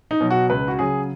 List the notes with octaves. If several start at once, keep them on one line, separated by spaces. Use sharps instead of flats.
D#4
B2 F#3
F#4
C#2 B4
F#4
C#3 F#3 G#4